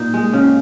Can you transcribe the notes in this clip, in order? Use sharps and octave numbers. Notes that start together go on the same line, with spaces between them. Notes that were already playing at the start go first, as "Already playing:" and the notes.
Already playing: A#2 D#4
G#3
C#3